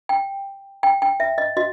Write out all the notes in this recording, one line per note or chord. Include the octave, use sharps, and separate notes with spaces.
G5
G5
G5
E5
D#5
F#4 D#5